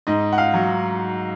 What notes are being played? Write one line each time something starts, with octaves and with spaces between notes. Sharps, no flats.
G#2 D#5
F#5
F5
F#3